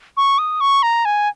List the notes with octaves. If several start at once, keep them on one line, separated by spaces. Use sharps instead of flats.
C#6
D#6
C#6
A#5
G#5